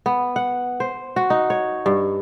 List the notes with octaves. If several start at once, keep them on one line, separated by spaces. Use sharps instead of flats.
B3
F#5
C5
F#4
D#4
C#5
G2